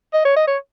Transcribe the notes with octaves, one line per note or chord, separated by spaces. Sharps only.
D#5
C#5
D#5
C#5